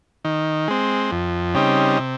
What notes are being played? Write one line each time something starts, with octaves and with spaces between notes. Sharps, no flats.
D#3
G#3 C4
F2
C#3 G3 C4 D#4
C3